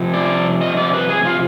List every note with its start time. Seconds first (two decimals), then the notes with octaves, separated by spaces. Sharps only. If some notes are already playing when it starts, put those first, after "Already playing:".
Already playing: F2 C3 F3
0.13 D5
0.61 D#5
0.77 D5
0.93 B4
1.09 G#4
1.25 F4